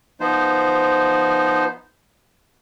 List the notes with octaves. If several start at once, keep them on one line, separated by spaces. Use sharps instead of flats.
F3 B3 D#4 C5